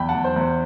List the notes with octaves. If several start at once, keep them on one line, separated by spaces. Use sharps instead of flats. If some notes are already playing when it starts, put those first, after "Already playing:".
Already playing: E2 G5 B5
F#5 A5
E2
C5
E2 C5